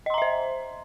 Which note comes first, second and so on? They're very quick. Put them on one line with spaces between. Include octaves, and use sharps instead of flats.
D#5 C6 A#5 E5 C5